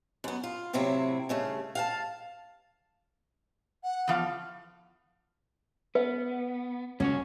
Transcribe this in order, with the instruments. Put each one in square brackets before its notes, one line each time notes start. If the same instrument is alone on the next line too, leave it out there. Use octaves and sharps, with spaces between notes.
[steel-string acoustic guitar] F#2 B3
F4
A2 C3 F#3 C4 E4
G2 C#3 A3
F5 F#5 A5
[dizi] F#5
[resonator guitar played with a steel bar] E2 F3 F5
[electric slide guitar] B3 [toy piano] B4
[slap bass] C#2 [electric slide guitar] A#2 F#4 C#5 [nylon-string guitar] C#4